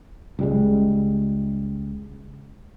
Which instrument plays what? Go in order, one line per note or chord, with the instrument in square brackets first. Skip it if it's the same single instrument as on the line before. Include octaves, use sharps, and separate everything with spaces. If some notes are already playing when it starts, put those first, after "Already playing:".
[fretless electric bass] C#2 G3 G#3